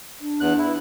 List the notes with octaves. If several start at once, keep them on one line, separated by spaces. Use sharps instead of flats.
D4
E2 F#6
E4